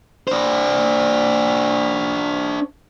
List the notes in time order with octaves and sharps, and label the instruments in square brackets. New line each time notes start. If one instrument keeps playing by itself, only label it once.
[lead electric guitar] D4 C5